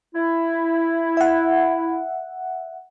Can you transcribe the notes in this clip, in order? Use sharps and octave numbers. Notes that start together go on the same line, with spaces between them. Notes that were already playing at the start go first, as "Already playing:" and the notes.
E4
E5 F#5